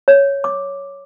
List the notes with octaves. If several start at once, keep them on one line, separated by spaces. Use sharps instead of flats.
C#5
D6